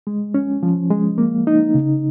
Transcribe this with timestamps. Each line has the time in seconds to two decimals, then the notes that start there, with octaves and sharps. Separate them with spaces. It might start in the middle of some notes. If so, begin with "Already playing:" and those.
0.07 G#3
0.34 C#4
0.63 F3
0.90 G#3
1.18 A#3
1.47 D#4
1.75 C#3